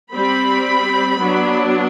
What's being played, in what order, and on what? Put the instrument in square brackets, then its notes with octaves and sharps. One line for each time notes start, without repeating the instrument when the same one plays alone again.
[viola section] G3 C4 B5
F#3 B3 D4